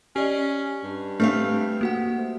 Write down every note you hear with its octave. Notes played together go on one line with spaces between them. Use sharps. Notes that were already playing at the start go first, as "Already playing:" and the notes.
C#4 G4 D5 D#5
G2
A3 C4 D4 F5 F6
A#3 F#4 F#5